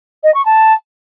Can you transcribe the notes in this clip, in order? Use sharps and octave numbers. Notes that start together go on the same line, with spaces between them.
D#5
C#6
A5